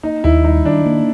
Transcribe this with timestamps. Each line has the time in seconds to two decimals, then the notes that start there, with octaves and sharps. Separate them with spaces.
0.03 A#3 D#4
0.24 D#2 E4
0.44 G3 D#4
0.65 D#3 D4
0.86 A#3